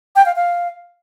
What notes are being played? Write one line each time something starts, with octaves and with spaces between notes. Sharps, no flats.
G5
F5
F5